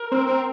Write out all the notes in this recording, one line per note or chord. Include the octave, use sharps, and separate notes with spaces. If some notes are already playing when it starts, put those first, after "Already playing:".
Already playing: A#4
C4
C4